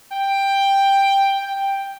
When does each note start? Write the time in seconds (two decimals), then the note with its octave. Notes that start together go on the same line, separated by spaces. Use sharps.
0.12 G5
1.43 G5